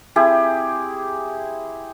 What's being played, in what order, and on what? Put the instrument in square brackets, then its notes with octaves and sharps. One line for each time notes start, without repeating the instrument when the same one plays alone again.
[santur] C4 E4 G4 G#4